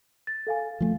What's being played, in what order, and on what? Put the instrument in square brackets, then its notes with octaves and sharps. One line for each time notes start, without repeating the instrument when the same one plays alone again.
[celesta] A6
A4 F5 G#5
[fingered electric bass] F3 A3